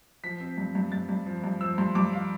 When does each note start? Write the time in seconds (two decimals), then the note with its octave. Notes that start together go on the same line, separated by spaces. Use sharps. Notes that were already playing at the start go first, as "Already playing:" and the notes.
0.24 F3 B6
0.40 C4
0.58 G2
0.75 G2
0.92 G2 A6
1.09 G2
1.26 F3
1.44 G2
1.61 F3 E6
1.78 G2 C6
1.95 G2 D6
2.13 F3 F5